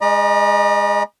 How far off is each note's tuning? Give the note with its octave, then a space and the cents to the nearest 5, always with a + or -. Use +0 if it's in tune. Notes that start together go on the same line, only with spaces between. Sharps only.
G#3 +0 D#5 -45 A#5 +40